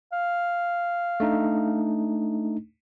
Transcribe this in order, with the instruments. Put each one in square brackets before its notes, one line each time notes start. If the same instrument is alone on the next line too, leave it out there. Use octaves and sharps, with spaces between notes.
[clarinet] F5
[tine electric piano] A3 D4 D#4